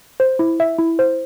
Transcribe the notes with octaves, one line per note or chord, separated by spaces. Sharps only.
C5
E4
E5
E4
C5